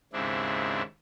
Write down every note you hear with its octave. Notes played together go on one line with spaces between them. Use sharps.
D#2 G#2 C#3 C4 D4 E4